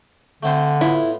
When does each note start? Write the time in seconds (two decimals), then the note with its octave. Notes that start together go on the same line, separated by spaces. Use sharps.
0.43 D3 A3 C4 C5
0.81 A2 B3 E4 F4